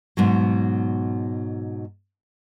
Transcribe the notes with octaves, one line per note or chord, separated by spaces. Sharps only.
G#2 B2 F#3